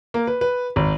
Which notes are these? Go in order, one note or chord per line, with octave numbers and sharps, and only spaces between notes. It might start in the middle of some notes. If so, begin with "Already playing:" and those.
A#3
B4
B4
G#1